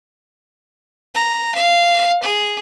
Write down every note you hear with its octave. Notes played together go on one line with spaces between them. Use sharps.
A#5
F5
G#4